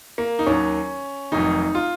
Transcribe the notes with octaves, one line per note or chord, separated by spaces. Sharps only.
A#3
D#4
D#2 D#3 F#3 C#4
F1 F2 D#3 F#3 D#4
F4